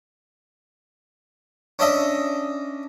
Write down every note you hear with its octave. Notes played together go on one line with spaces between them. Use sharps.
C#4 D4 D#5 E5